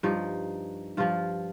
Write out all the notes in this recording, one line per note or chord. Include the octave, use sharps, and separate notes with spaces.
G2 F3 D#4
G2 F3 F4